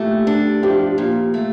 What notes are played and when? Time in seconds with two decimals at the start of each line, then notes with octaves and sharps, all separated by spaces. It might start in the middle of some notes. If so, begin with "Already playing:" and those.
Already playing: A#2 A3 G4
0.27 D4
0.63 F3 G4
0.81 G4
0.98 A#2
1.34 A3